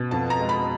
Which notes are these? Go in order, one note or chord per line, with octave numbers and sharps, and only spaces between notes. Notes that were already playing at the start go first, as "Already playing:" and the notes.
Already playing: B2
F2 A5
A#5
G#3
B5